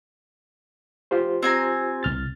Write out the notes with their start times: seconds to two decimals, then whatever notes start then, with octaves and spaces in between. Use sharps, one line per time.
1.11 F4 G4 C5
1.43 C4 G#5 A#5
2.03 C2 F6 A6